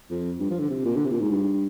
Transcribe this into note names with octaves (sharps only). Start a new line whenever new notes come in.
F2
G2
F3
D3
C3
A#2
D3
C3
A#2
G#2
G2